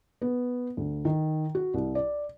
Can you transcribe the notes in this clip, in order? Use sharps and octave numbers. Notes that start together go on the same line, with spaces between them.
B3
D2
D#3
F#4
C2
D5